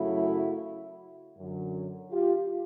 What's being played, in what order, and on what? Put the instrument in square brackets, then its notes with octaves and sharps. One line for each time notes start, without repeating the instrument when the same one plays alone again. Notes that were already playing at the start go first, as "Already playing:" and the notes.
Already playing: [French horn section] F#2 C#3 F#3 A3 E4 F#4
F#2 D3 F#3
F4 G4